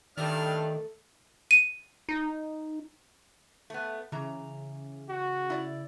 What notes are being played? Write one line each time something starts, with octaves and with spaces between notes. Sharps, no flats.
G2 D#3 A3 D4 D5 E5 F6
D#7
D#4
A3 B3
C#3 E3 A#5
F#4
E4 D5